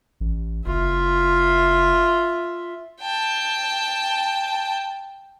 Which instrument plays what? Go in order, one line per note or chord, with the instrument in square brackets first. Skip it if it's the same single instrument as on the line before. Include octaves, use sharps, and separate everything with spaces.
[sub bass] A1
[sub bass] F#1 [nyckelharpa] F4 E5
[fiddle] G5 A5